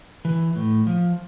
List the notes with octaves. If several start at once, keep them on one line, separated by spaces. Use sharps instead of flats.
E3
A2
F3